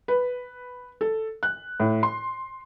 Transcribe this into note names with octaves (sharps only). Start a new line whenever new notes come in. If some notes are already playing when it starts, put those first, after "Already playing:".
B4
A4
F#6
A2
C6